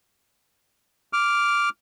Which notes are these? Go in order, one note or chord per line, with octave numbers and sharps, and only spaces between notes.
D6 F6